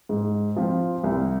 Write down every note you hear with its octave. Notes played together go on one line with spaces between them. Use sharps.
G#2
F3 C4 F4
C2